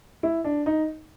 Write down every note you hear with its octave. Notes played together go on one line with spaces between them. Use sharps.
E4
D4
D#4